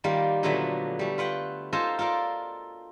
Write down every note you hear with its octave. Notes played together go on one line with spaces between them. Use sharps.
D#3 G3 A#3 F4
A#2 D3 F3 F#3 A3 B3
G3 A3
F4 B4 F#5 G5
D#4 F4 A4 C5 G#5 A#5
F4 A4 A#4 D5